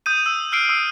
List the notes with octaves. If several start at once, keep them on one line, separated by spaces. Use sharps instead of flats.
D#6 G6 D#7
E6
E6 F6 C7 D7
D#6 E6